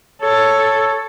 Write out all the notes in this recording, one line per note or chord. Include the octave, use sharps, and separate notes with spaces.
A4 C#5